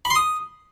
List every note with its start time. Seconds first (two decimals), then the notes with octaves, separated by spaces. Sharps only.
0.05 B5
0.10 C6
0.15 D#6